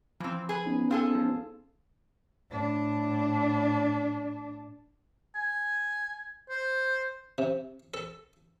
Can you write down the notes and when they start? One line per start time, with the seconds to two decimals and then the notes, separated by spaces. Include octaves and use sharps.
0.20 E3 F3 C4
0.49 G#4 B4
0.66 B3 C#4 D#4
0.91 C4 F4 G#4 A4
1.15 F3
2.50 A2 D4
5.35 G#5
6.50 C5
7.38 C3
7.94 A4